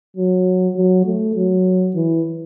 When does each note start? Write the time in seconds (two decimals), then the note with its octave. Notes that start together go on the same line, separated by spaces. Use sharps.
0.17 F#3
0.77 F#3
1.06 A3
1.36 F#3
1.95 E3